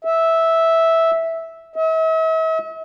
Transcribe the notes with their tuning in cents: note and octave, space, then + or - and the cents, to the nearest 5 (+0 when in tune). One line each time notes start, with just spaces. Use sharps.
E5 -10
E5 -45